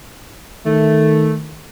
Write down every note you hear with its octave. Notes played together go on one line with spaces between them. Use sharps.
D#3 A3